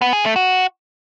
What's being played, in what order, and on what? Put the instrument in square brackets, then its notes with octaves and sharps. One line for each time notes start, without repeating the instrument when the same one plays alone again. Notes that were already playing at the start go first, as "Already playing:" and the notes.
[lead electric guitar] B3
G#4
A3
F#4